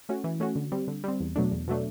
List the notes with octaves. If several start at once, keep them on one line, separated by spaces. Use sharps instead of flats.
A3 C#4 F#4
E3
A3 C#4 F#4
D3
G3 C4
D3
G3 C4
E2
B2 F#3 A3 D4
E2
B2 F#3 A3 D4